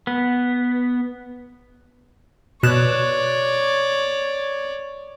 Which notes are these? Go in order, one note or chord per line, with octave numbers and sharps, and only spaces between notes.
B3
B2 C#5 D5 F#6 E7